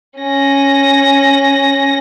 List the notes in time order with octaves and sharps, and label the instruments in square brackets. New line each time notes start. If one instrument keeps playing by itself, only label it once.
[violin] C#4 A#6